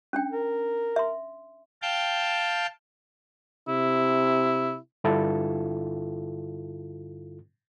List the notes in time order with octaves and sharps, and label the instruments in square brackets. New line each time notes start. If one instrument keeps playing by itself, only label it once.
[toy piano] C#4 D4 G5
[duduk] A#4
[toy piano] E5 C6
[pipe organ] F5 G5 A5 G6
[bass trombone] C3 [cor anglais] E4
[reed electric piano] G2 D3 E4 F4 A4